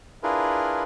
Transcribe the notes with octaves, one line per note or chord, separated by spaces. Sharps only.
D4 E4 F4 G#4 A#4 B4